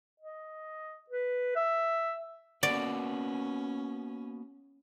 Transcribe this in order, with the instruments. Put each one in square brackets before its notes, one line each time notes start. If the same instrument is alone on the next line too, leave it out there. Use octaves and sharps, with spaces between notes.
[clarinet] D#5
B4
E5
[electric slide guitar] A#3 B3 F#4 [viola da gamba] C#4 [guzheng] D5